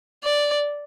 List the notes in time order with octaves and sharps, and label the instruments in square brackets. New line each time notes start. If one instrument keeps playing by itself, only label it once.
[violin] D5